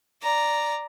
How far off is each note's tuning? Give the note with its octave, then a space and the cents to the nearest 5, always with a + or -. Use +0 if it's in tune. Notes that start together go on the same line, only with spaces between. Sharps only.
D5 +0 A#5 +0